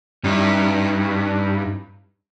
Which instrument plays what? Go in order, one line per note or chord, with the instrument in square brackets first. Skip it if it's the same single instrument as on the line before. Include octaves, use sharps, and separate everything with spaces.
[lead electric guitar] G2 [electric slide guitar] C#4 D#4 E4